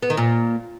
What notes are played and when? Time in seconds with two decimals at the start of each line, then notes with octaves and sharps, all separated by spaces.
0.02 B3
0.10 D#3
0.17 A#2